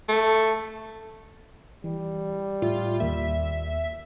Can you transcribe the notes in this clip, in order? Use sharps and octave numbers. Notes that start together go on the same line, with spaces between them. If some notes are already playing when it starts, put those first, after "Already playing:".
A3
E3 G3
A2 F4 E5
D#2 A#3 E5